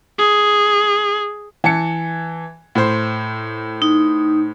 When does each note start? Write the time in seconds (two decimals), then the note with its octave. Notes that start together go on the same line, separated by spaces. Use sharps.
0.19 G#4
1.64 E3 A5 C#7
2.75 A2 C5
3.82 D#4